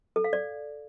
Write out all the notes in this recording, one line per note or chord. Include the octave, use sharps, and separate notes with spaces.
A4
F5
D5